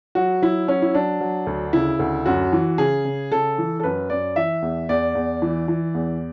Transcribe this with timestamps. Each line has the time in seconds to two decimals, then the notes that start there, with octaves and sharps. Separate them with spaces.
0.15 F#3 F#4
0.42 F#3 E4
0.68 F#3 C#4
0.82 E4
0.94 F#3 D4
1.21 F#3
1.47 D2
1.73 C#3 E4
1.99 D2
2.26 F#2 F#4
2.53 E3
2.78 C#3 G#4
3.05 C#3
3.32 C#3 A4
3.58 E3
3.80 A4
3.83 F#2 B4
4.10 F#2 D5
4.36 E3 E5
4.62 E2
4.89 E2 D5
5.15 E2
5.42 E3
5.68 E3
5.95 E2